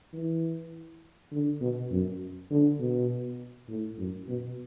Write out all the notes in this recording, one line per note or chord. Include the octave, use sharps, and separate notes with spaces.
E3
D3
B2
F#2
D3
B2
A2
F#2
B2